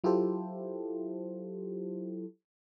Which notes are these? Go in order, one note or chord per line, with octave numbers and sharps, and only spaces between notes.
F#3 E4 F4 G4 A4 C5